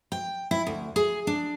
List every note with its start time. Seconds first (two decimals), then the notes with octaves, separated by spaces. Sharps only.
0.12 G5
0.51 E4
0.67 D2
0.96 G#4
1.27 D4